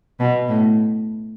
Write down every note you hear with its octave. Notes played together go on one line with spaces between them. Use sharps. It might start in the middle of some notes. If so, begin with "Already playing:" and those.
B2
A2